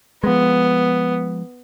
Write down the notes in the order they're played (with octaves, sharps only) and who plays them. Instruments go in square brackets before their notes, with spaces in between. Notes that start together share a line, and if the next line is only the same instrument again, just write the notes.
[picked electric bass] F3 G#3 [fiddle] B3